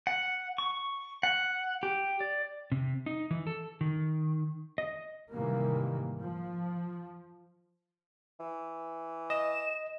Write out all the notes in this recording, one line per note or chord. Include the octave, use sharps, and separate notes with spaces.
F#5
C#6
F#5
G4
D5
C3
D#4
E3
A4
D#3
D#5
G#2 C3 D#3 E3 G3 A#3
F3
E3
D#5 E7